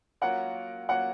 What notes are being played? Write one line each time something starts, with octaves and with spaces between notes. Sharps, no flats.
F#3 A#3 C#4 F4 A#4 F#5
F#3 A#3 C#4 F4 A#4 F#5